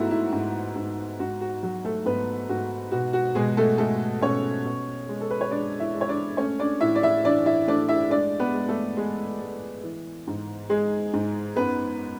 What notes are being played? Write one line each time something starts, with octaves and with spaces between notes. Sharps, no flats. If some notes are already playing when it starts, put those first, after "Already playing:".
Already playing: G#2 A3 B3 E4 F#4
E4
G#2
G#2
G#2 F#4
F#4
F#3 F#4
A3 A4
G#2 B3 B4
G#2 F#4
B2 F#4
F#4
B2 G#3 G#4
A3 A4
G#3 A3 A4
B2 C#4 C#5
B2
G#3
A4
B4
C#5
G#3 D4 D5
E4 E5
G#3
C#5
D4 D5
A3 C#4 C#5
D4 D5
A2 E4 E5
D5
E4 E5
E3 D4 D5
E4 E5
A3 D4 D5
E4 E5
G#3 D4 D5
B3 B4
G#3
A3 A4
G#3 G#4
G#3
E3
G#2
G#3 G#4
G#2
F#2 B3 B4